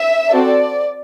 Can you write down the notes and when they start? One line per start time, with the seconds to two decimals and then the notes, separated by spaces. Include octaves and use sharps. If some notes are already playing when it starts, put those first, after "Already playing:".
Already playing: E5
0.30 C4 F#4 A4 D5